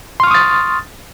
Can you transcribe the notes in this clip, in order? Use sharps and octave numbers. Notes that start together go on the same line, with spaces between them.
C6 C#6 D#6 F6 A6